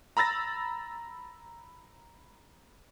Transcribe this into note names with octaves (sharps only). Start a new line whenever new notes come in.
A#5 B5 E6 A6 A#6